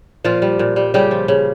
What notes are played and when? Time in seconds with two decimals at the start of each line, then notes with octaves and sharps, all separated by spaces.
0.24 A#2 F3 F4
0.42 G3
0.59 A#2
0.76 G3
0.94 C#3 G3 G4
1.11 F3
1.28 C#3